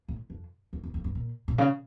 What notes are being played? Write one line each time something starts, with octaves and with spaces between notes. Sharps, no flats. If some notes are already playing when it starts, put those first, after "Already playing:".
A2
F2
F2
E2
F2
G2
A#2
A#2
C#3